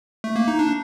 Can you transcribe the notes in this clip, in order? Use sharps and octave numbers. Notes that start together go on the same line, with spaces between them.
A3
A#3
D#4
D4